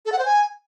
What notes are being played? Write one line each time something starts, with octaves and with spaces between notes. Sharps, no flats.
A4
F#5
C5
G#5